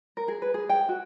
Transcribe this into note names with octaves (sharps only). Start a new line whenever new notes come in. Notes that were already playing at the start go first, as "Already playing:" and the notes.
A#4
G#4
B4
G#4
G5
F#4